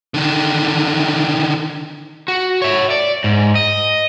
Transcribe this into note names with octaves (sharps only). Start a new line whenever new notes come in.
D3 D#3
F#4
C#5 E5
D5
G#2
D#5